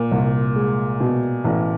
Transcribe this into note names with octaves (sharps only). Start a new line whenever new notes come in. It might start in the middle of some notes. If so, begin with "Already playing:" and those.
Already playing: A#2
C2
G#3
B2
A1